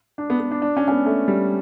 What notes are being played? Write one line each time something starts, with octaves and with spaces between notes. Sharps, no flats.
D4
B3
B3
D4
D4
C#4
C#4
B3
A3
G3